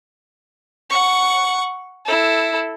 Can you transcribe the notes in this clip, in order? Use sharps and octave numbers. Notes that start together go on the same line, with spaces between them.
F#5 C#6
E4 A4